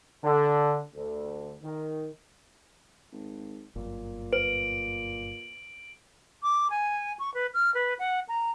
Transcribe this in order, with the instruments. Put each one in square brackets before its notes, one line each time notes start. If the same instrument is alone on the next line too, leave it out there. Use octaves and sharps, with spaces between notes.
[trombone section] D3
D2
D#3
[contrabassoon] G#1
[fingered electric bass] G1 F#2 [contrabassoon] A#2
[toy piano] B4 [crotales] D7 F#7
[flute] D6
G#5
C#6
B4
F6
B4
F#5
A#5